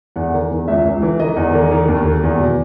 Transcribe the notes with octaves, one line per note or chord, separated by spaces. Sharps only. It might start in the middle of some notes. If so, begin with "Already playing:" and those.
E2 F#5
D#3
E2
C#2 E5
C#2
E3
D#3 D#5
E2
D#3
D#3
D#2
D#3
E2
B2